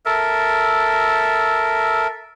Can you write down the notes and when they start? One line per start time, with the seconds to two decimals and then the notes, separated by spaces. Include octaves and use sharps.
0.05 A4 A#4 E5